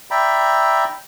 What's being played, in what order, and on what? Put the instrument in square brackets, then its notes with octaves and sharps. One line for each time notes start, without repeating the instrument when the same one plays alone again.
[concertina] D5 E5 G5 A#5 B5